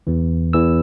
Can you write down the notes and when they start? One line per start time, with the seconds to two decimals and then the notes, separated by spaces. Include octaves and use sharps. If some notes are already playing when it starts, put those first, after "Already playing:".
0.07 E2 E3
0.53 E2 E3 E6